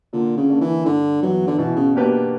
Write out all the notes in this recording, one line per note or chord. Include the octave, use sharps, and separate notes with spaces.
A#2 D3
C#3
A#3 D4 A#4 D5
E3
G2 D3
E3 F#3 B3
D3
B2 E3
C#3
B2 A#3 D4 G4 B4